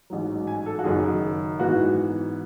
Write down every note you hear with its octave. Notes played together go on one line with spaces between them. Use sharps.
A1 G#2 F#3
G#5
A4
F#4
F#1 F#2 D#3 G#4
G#2 E3 B3 F#4